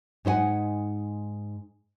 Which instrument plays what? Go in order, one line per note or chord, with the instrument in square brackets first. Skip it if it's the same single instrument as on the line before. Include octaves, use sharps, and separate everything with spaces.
[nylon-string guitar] G#2 D#4 C5 F#5 G#5